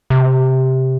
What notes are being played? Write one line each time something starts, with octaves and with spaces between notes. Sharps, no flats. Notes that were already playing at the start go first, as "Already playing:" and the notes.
C3